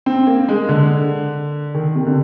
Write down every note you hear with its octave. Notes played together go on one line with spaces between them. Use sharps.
C4
A#3
G#3
D3
D#3
C3
D3